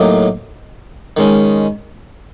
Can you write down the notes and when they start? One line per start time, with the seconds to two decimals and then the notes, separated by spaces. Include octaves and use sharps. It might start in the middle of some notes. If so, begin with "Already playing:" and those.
Already playing: A2 F#3 A#3 D#4 G4
1.17 D#3 G#3 C#4